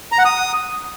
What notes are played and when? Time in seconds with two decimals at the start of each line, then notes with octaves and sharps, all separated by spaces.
0.12 A#5
0.19 F#5
0.25 D#6